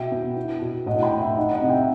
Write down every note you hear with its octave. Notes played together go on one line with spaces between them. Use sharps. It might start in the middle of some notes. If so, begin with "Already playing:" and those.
Already playing: B2 E5 G5
B3
E4
B2
A2 D#5 F#5
G5 B5
A2
E5 G5
D#4 D#5 F#5
D#5 F#5
C3
E5 G5